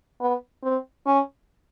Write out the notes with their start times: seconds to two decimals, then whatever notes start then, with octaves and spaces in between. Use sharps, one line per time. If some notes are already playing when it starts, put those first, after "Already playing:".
0.21 B3
0.63 C4
1.06 C#4